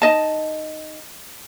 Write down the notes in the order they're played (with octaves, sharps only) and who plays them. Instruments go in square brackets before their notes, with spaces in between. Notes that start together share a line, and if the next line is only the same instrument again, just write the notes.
[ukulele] D#4 D#5 A5